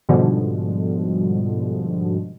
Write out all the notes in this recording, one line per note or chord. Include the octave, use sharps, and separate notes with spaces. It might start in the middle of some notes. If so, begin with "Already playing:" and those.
G#2 B2 D3 F3 G3 G#3